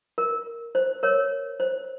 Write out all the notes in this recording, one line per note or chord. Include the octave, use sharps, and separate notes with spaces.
A#4
C5
A#4 C#5
C5